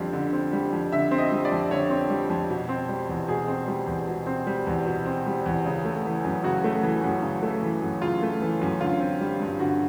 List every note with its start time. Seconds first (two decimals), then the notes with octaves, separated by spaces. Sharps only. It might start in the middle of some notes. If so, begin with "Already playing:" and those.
Already playing: F2 D3 G3 C4
0.13 D3
0.33 C4
0.53 G3
0.72 F2
0.92 D3 E5
1.11 C4
1.18 D#5
1.32 G3
1.45 D5
1.52 F2
1.70 D3 C#5
1.90 C4
2.10 G3
2.30 F2
2.50 B2
2.69 C4
2.89 G3
3.09 E2
3.28 B2 G#4
3.48 C4
3.68 G3
3.87 E2
4.07 B2
4.27 C4
4.47 G3
4.67 E2
4.86 B2
5.05 C4
5.26 G3
5.46 E2
5.66 C#3
5.85 A3
6.05 E3
6.25 F#2
6.44 C#3 F#4
6.64 A3
6.83 E3
7.04 F#2
7.22 C#3
7.43 A3
7.62 E3
7.82 F#2
8.01 C#3 F4
8.22 A3
8.42 E3
8.62 F#2
8.81 D3 F4
9.00 C4
9.21 G3
9.40 G2
9.59 D3 F#4